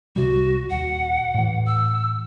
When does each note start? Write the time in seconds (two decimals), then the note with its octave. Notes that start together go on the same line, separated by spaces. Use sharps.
0.16 C2 C3 G3 F#4
0.70 D#1 F#5
1.34 A2 E3
1.67 E6